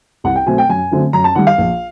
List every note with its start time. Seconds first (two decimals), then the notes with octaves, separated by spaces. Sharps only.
0.24 C2 F#5
0.36 G5
0.47 B2 F#3 A3 C4 G#5
0.58 G5
0.69 F#2 G#5
0.91 D3 F#3 A3 C4
1.13 F#2 A#5
1.24 A5
1.35 D#3 G3 F#5
1.47 F5
1.58 A#1